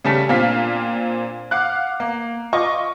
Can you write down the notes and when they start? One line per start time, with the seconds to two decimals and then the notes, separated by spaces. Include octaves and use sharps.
0.04 C#3 G3 A3 C#4 A5 B6
0.29 A#2 C4 D4 F5 B6
1.51 F5 F#5 D6 F#6
2.00 A#3
2.53 F4 D#5 C#6 D6